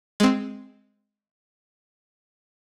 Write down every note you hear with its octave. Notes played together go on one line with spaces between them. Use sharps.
G#3 C4